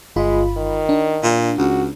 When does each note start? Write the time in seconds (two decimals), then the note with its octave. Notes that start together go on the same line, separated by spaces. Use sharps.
0.16 G1 G#3 F4 B5
0.57 D#3
0.89 D4
1.23 A#2
1.58 C#2 F#4